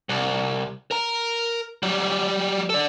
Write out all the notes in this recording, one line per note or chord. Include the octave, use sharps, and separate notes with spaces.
C2
A#4 A#5
F#3 G3
A4 D5